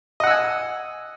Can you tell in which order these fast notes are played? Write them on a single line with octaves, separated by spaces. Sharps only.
D#5 F#5 E6 G#5